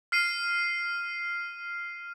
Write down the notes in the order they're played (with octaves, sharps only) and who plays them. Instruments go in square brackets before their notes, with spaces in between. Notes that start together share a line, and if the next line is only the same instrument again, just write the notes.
[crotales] F6 C7 D#7